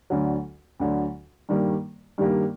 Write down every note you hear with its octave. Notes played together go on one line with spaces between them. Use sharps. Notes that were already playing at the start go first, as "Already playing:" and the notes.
D2 D3 F#3
D2 D3 F#3
G2 D#3 G3 A#3
G2 D#3 G3 A#3